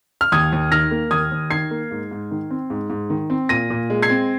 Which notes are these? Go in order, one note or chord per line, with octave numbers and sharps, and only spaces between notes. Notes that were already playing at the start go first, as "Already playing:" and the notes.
F6
D#2 D#6 G#6
D#2
D#3 F6 A#6
A#3
D#2 D#6 G#6
D#2
D#3 G#6 C7
A#3
G#2
G#2
D#3
C4
G#2
G#2
D#3
C4
A#2 A#6 D#7
A#2
G#3
G#6 C7
C4